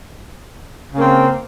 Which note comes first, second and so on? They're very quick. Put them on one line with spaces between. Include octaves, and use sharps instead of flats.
C#3 A#3 C4